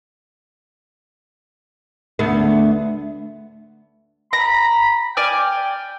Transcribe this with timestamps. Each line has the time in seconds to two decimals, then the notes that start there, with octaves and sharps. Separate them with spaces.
2.19 D2 B3
4.33 A#5 B5
5.17 D5 G5 G#5 F6